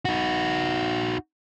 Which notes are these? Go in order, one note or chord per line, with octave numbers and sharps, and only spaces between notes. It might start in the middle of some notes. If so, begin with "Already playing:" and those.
D#4 F#4